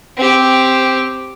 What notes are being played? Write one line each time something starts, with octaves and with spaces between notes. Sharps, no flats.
C4 G4